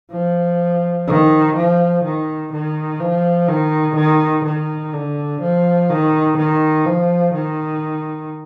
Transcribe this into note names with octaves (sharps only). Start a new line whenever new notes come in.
F3
D#3
F3
D#3
D#3
F3
D#3
D#3
D#3
D3
F3
D#3
D#3
F3
D#3